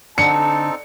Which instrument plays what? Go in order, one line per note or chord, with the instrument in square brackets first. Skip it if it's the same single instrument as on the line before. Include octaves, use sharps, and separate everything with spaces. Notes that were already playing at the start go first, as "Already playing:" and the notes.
[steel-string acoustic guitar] D3 [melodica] C4 D#4 A4 [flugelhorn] A5 [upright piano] C#7